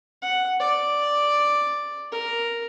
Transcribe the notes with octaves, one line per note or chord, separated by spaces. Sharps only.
F#5
D5
A#4